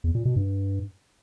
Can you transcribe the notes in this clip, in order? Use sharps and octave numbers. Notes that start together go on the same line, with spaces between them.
E2
A#2
B2
G2